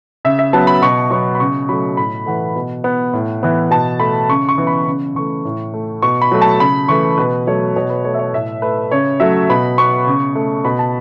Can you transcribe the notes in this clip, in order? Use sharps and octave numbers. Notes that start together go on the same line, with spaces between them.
C#3 E5
E5
F#3 B3 A5
B5
B2 C#6
F#3 B3 C#6
B5
C#3 C#6
F#3 A3 B5
A2 B5
E3 A3 F#5
B2
B3
A2
E3 B3
B2 A5
A3 B5
C#3 C#6
C#6
E3 B3
B5
C#3
E3 A3 C#6
A2
A3
B2 C#6
B5
F#3 A3
A5
C#3 B5
E3 A3 C#6
B2 B4
F#3 A3 C#5
B2 C#5
B4
A3 C#5
E5
C#5
A2 E5
A3 B4
C#3 C#5
F#3 A3 E5
B2 B5
B3 C#6
C#3
A3
B2 B5
A5